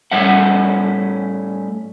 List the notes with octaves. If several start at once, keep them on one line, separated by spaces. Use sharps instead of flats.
A2 G3 C#4 E5 F#5